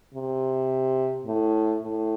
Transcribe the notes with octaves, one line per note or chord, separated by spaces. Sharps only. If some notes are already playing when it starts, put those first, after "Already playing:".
C3
A2
A2